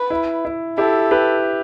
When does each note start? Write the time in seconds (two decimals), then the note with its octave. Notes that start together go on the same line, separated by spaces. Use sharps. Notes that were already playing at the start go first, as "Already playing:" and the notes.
Already playing: B4
0.10 E4
0.45 E4
0.78 E4 G4 A4
1.11 G4 B4